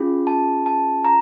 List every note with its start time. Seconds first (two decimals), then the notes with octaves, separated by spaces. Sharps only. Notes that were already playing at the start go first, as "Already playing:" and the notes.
Already playing: C#4 F4 G#4
0.27 A5
0.66 A5
1.05 A#5